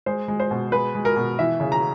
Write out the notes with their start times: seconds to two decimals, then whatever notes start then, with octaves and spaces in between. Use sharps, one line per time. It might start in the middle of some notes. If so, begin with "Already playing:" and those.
0.06 G#3 C5
0.28 G#3
0.40 C5
0.51 B2
0.72 G#3 B4
0.95 G#3
1.05 A#4
1.16 B2
1.39 E3 E5
1.60 C#3
1.72 A#5